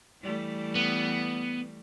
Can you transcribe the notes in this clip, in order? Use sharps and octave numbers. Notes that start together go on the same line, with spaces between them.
E3 G3 A3
B3